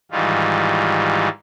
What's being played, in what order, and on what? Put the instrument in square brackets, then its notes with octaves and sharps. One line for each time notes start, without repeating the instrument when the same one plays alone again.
[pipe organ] G#2 D#3 E3 G3 F4